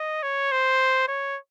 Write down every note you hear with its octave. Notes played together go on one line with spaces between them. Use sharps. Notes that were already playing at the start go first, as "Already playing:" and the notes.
Already playing: D#5
C#5
C5
C#5